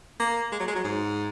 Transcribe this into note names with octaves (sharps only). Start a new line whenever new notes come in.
A#3
G#3
F#3
G#3
F#3
G#2